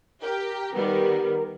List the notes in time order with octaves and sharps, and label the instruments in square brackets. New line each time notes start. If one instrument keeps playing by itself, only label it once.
[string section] G4 [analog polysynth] A#4
[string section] D#3 G3 B3